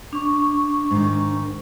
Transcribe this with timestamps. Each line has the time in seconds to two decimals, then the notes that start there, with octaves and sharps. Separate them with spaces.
0.13 D4 C#6
0.91 G#2 D#3